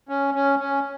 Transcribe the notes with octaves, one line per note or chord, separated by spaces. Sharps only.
C#4
C#4
C#4